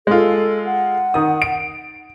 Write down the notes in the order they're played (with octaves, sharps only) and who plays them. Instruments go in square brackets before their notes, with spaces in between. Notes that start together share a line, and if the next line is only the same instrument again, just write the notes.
[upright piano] G#3 F4 [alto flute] A4
[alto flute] F#5
[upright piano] D#3 D#6
D7